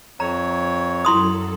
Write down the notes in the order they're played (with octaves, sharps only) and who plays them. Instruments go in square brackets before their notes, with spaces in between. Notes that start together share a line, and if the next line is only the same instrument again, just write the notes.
[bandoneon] F2 C#5 [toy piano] A#5
[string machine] F#2 F#3 A4 [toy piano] E4 C6 D#6